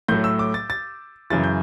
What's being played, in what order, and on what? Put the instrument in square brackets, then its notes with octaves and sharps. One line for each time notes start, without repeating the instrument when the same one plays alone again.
[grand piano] A2 F#3 A3 G6
E6
D6
A6
A6
F#2 C#3 E3 A6
G6